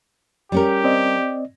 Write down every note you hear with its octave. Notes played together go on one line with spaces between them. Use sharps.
G3 C#4 G4 A#4
C4 D5 D#5